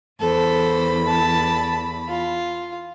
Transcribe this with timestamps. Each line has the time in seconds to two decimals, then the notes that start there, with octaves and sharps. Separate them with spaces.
0.20 E2 A4 C5 B5
1.06 A5
2.09 F4